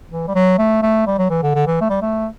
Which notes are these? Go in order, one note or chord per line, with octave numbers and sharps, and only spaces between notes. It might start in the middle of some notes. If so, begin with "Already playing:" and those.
E3
G3
F#3
A3
A3
G3
F#3
E3
D3
D3
E3
A3
G3
A3